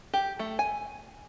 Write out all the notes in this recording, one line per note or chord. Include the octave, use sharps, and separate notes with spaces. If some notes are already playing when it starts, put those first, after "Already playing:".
G4
A3
G#5